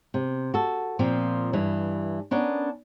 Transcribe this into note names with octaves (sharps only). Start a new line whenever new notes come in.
C3
F#4 A4
A#2 F3 C4
G2 E3
B3 C#4 D4 A#4